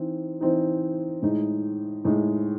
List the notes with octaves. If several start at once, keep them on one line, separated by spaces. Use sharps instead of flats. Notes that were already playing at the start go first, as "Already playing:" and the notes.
Already playing: E3 C4 D#4
E3 C4 D#4
A2 G#3 D#4
A2 G#3 D#4